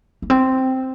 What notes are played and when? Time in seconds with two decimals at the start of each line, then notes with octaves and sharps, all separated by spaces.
0.22 A#3
0.30 C4